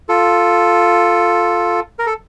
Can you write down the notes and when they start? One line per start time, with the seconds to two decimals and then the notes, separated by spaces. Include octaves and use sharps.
0.09 F4 A4
1.99 A#4
2.06 A4